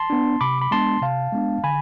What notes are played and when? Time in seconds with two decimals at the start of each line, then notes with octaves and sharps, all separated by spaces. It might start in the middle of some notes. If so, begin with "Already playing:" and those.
Already playing: A5 C6
0.10 B3 D4
0.41 C3 B5 D6
0.62 B5
0.71 G#3 B3 D4 A5 C6
1.02 C3 F5 A5
1.33 G#3 B3 D4
1.64 D3 G#5 B5